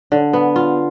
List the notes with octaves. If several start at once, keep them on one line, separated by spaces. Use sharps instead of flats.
D3
B3
F4